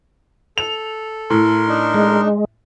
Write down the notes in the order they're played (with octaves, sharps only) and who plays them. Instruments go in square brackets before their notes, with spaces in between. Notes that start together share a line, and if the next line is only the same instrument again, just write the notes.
[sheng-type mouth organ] A4 [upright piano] F7
[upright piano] A2 [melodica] A#4 C6
[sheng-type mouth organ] D4 D#4
[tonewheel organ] G#3